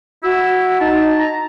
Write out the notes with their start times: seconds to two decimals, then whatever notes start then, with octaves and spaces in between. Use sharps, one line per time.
0.23 E4 F#4 E6
0.80 D#4 A5
1.18 A#5